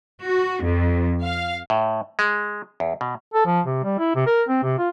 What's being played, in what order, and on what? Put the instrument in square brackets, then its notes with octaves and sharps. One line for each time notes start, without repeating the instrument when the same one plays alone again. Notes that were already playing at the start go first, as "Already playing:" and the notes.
[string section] F#4
F2
F5
[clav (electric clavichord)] A2
G#3
E2
B2
[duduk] A4
F3
C3
G3
E4
C3
A#4
C4
C3
F4